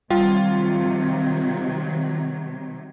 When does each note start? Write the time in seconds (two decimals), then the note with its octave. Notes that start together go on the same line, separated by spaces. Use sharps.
0.11 C3 D#3 F#3 G3 F4